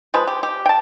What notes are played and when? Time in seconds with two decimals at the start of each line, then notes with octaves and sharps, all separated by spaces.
0.14 F3 G#3 B4
0.27 G4
0.43 G4
0.66 G5 A5